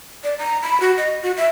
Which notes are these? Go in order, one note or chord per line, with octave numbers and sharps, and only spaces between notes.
D5
A#5
B5
F#4
D#5
F#4
E5